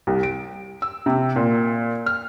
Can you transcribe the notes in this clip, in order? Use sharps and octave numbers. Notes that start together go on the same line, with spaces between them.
C2
D7
E6
C3
A#2
F6